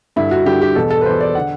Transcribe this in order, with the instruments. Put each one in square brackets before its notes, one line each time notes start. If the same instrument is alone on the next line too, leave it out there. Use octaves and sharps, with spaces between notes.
[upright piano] G2 D3 E4
F#4
G2 D3 G4
G4
E2 B2 A4
A4
B4
E2 B2 C5
D5
D3 F#5